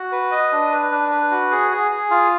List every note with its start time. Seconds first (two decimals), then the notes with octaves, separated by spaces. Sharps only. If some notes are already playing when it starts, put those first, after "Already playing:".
Already playing: F#4
0.12 B4
0.31 D#5
0.52 D4
0.72 B4
0.91 D4
1.11 B4
1.31 F#4
1.51 G#4
1.71 G#4
1.91 G#4
2.11 F4